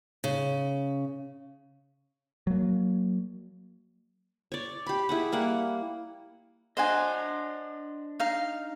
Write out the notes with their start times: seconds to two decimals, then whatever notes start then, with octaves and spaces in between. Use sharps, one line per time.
0.24 C#3
2.47 F#3 A#3
4.52 C#5 D5
4.86 G4 B5
5.09 E4 G#4 F#5
5.32 G3 A#3 F#5
6.77 D4 C5 D#5 F#5 G#5
8.20 D#4 F5